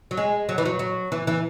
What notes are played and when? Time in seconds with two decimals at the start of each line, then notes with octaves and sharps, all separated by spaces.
0.11 F#3
0.17 G#3
0.49 F#3
0.58 E3
0.65 F#3
0.79 F#3
1.12 E3
1.27 E3